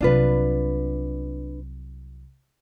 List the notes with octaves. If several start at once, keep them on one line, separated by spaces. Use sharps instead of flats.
C2 F#3 D4 F4 B4